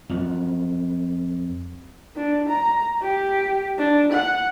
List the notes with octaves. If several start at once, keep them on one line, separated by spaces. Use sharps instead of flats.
F2 F#3
D4
A#5
G4
D4
F#5